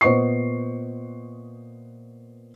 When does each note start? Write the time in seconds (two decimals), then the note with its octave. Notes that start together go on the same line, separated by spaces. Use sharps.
0.01 A#2 B3 C5 D#5 C#6 C7